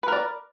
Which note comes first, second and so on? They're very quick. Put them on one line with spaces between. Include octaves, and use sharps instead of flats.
B4 A#4 D5